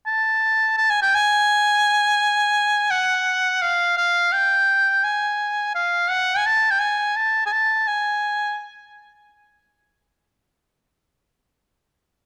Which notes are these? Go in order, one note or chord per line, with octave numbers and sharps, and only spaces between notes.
A5
A5
G#5
G5
G#5
F#5
F5
F5
G5
G#5
F5
F#5
G#5
A5
G5
G#5
A5
G#5
A5
G#5